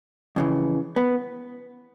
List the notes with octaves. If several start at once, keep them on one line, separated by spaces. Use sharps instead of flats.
F2 C#3 E3
B3